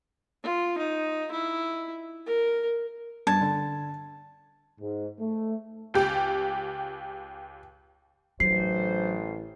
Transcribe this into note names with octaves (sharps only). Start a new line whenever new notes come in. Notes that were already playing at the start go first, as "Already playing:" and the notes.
F4
D#4
E4
A#4
G2 A5 G#6
D3
G#2
A3
C#2 G4
A1 F#3 D4 A4 C5 C7